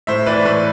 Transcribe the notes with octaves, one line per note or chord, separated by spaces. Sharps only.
A2 C5 E5
E3 B4 D5
A2 B4